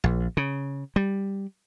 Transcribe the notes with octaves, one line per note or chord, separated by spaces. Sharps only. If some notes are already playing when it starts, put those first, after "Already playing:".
A#1
C#3
G3